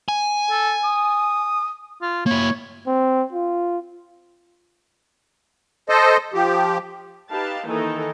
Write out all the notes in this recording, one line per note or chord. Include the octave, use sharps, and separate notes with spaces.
G#5
A4
D#6
F4
A#3 E4 C#5
C4
F4
A4 C5 D#5
F3 G4
D#4 G4 B4 F5 A5
D#3 E3 A#3 D#4 A4 D#5